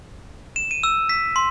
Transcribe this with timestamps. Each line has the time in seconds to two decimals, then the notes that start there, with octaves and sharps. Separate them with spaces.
0.56 E7
0.71 D#7
0.83 E6
1.09 B6
1.36 C6